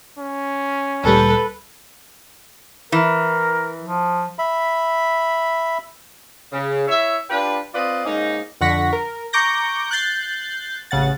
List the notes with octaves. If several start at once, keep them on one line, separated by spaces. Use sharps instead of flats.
C#4
D2 A#2 G3 A4 B4
E3 A#4
F3
E5 B5
C#3
E4 C#5 E5
D4 F4 G4 B4
C4 F4 B4 D5 D#5
G#2 A#3 C#4 D#4
F2 D3 F#5 C#6 A#6 B6
A#4
A#5 C#6 D6 G6 A#6
F#6 G6 A6 C7
A1 C#3 F#5 A6